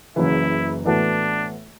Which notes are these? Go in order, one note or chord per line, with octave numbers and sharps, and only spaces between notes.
F#1 F#2 C#3 E3 E4
A2 E3 B3 D4 F#4 A4